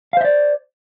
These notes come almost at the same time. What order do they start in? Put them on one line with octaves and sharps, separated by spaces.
F5 C5 E5 D5